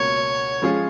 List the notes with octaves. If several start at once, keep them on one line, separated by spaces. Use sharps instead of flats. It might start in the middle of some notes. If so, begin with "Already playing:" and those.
Already playing: C#2 B2 A#3 C#5
F3 G#3 C#4 F4 G#4